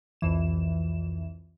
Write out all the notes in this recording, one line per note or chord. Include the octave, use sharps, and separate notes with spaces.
C2 F2 E3 E7